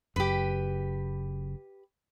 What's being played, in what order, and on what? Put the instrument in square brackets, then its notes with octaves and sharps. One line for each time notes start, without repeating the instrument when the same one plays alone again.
[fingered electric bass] F#1 F#2 C#3 [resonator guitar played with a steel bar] G4 B4